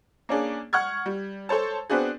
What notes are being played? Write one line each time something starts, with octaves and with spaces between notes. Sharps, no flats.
A#3 C#4 D4 G#4
F#5 C#6 F6 G#6
G3
A4 C5 C#5 A5
B3 C4 D4 F#4 G#4